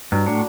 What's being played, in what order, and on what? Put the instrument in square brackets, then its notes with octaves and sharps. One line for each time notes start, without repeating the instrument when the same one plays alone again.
[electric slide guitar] G2 [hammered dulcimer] F#3
[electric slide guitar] A2 [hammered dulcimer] D4